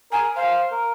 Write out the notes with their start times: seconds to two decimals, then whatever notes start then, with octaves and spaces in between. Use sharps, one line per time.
0.12 A#4 G#5
0.36 C5 F5
0.72 A#4